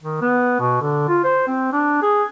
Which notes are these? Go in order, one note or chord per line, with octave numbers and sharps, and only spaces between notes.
D#3
B3
B2
D3
F4
C5
C4
D4
G#4